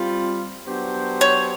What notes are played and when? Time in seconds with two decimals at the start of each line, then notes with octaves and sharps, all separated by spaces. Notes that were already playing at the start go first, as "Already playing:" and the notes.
Already playing: G3 C4 F4
0.65 F#3 B3 D4 G4 C5
1.21 C#5